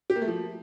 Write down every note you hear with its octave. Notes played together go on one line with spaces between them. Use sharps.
G4
A#3
A3
F3